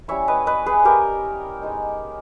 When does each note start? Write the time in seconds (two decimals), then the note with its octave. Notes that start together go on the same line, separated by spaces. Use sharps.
0.08 G3 C#4 E4 C#5 E5
0.28 B4 D#5
0.46 B4 D#5
0.66 G#4 B4
0.85 G4 A#4
1.62 G#3 B3 D#4